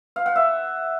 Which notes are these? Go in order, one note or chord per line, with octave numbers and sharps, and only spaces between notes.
F5
F#5
E5